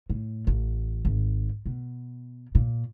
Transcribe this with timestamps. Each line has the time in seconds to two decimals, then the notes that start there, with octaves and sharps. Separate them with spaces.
0.10 A2
0.47 A1
1.05 G#1
1.66 B2
2.55 A#2